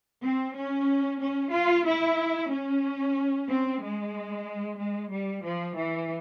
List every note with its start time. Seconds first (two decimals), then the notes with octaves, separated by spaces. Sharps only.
0.22 C4
0.55 C#4
1.20 C#4
1.52 F4
1.85 E4
2.50 C#4
3.48 C4
3.81 G#3
4.79 G#3
5.11 G3
5.44 F3
5.76 E3